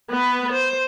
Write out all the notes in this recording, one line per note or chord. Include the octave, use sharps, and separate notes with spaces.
B3 B4
C5